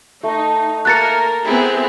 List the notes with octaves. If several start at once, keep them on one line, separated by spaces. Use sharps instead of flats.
A3 D#4
A#3 A#4 F#6 A6 C#7
B3 C4 E4 G#4